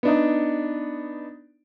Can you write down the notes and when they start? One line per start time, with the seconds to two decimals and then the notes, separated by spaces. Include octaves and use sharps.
0.03 B3 D4 D#4